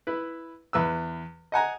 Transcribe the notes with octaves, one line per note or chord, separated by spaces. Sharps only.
E4 B4
E2 B4 E6
D#5 F#5 G#5 A#5